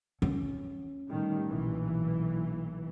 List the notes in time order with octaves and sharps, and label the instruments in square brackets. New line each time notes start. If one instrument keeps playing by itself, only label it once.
[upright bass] C#4
[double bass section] A2 D#3 G3
B1 A#2 E3